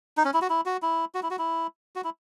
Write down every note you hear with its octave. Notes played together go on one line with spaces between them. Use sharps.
D#4
C#4
E4
F#4
E4
F#4
E4
F#4
E4
F#4
E4
F#4
E4